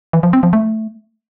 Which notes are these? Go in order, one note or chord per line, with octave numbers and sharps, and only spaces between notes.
E3
F3
C4
F3
A3